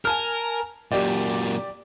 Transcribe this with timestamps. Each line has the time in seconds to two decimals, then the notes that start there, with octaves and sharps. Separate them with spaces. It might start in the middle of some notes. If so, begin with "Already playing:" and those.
0.05 A#4 G#5 A5 F6
0.92 F#2 A#2 G4 D5